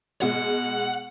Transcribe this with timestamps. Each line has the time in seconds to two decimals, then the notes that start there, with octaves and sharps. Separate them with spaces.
0.22 B2 G#3 F#5